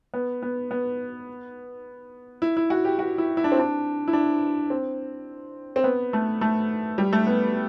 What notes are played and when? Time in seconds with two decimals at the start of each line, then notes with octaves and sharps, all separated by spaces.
0.14 B3
0.42 B3
0.71 B3
2.42 E4
2.57 E4
2.70 F#4
2.85 G4
2.99 F#4
3.18 E4
3.37 E4
3.44 D4
3.52 C4
3.59 D4
4.08 E4
4.13 D4
4.70 C4
5.76 C4
5.84 B3
6.13 A3
6.41 A3
6.98 G3
7.13 A3
7.27 B3